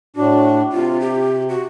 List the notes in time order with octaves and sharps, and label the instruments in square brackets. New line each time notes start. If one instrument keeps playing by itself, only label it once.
[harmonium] A2 D4 [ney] F#4
[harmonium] C3 [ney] F4
[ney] G4
F#4